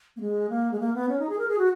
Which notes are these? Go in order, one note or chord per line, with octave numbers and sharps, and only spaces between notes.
A#3
G#3
A#3
G#3
A#3
B3
C#4
D#4
G#4
A#4
G#4
F#4